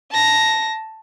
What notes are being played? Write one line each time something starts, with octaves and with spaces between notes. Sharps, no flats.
A5 A#6